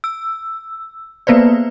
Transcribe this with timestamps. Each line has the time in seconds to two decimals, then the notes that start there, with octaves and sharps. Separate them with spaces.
0.04 E6
1.27 A#3 B3 B4 C5 D5